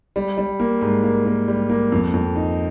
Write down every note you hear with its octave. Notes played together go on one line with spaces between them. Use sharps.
G3
G3
A#3
G#2
A#3
A#3
G3
A#3
F2
F2
D#4